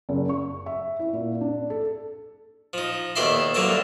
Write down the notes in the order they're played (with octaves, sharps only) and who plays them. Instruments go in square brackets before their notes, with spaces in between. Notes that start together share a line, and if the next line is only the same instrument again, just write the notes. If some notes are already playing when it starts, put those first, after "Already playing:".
[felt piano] F#1
C#6
E5
E4
A#2
D4
A4
[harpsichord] F3 D#4
D#2 B2 A4 D5 E5 C6
C2 D3 F#3 A#3 A4 A5